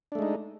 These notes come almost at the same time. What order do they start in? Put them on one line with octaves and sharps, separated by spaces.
D4 A3 G#3 D#4